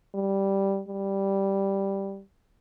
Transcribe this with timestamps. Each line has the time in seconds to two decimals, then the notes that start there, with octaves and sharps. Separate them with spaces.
0.15 G3
0.89 G3